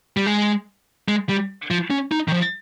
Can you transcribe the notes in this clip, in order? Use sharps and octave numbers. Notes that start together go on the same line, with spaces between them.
G3
G#3
G#3
G3
F3
C#4
D#4
D#3
F3